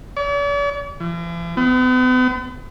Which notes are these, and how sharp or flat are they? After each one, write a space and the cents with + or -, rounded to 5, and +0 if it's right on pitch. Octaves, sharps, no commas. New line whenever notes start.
D5 -45
E3 +45
B3 +40